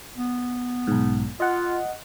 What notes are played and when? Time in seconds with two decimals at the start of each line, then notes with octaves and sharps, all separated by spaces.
0.16 B3
0.87 B1 G#2
1.40 F4 D#5 F#5